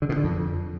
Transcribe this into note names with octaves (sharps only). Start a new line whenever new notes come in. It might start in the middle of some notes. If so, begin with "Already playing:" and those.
D3
B2
D3
F2